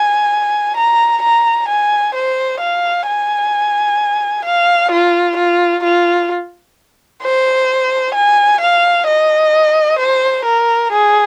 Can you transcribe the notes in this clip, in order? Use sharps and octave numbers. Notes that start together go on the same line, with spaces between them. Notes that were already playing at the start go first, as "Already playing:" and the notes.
Already playing: G#5
A#5
A#5
G#5
C5
F5
G#5
F5
F4
F4
F4
C5
G#5
F5
D#5
C5
A#4
G#4